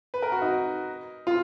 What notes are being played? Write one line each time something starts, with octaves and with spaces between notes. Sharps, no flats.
B4
A#4
F#4
D#4
F4